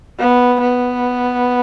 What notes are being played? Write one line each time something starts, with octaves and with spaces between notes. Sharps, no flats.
B3
B3